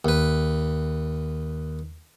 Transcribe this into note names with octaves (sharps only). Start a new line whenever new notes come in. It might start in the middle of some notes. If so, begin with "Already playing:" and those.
D#2 B4